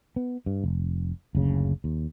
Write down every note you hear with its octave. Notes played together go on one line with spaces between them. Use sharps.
B3
G2
F1
F#1 D2 C#3
D#2